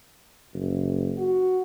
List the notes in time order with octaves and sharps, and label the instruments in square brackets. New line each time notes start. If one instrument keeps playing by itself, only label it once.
[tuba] F#1
[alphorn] F#4